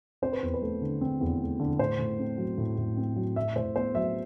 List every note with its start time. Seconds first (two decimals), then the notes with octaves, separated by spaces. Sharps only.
0.22 C4 C5
0.33 B4
0.42 E2
0.54 B4
0.62 A3
0.82 D3
1.01 C4
1.21 E2
1.41 A3
1.60 D3
1.79 A2 C5
1.99 A2
2.19 C4
2.38 F#3
2.58 A2
2.78 A2
2.97 C4
3.16 F#3
3.36 A2 E5
3.56 A2 C5
3.76 B3 C5
3.95 F#3 E5